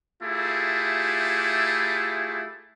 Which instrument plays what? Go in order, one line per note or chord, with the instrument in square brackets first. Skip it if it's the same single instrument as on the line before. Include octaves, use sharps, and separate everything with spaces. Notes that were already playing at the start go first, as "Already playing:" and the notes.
[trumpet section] A3 E4 F4 G4 G#4